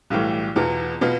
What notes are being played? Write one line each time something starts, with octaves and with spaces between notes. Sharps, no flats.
B1 A2 E3 G3
E2 B2 B3 F4
B2 B3 F4